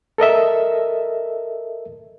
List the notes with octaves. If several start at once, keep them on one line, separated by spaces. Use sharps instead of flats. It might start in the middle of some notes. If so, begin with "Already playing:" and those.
A4 A#4 D#5 E5